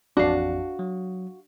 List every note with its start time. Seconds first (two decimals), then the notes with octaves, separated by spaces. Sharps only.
0.17 A1 F2 D4 F#4 F5
0.79 F#3